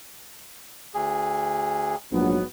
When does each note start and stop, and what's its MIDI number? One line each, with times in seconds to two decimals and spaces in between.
0.94 1.95 38
0.94 1.95 68
2.12 2.36 34
2.12 2.43 44
2.12 2.43 54
2.12 2.43 59